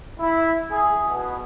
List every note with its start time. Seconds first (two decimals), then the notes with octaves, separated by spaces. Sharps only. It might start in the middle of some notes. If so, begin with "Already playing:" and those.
0.19 E4
0.71 G#4
1.07 B2